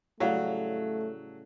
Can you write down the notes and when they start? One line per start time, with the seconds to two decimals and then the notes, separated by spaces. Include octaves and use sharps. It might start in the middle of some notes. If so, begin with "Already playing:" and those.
0.20 A2 C#3 F#3 G3 A3 F5 F#5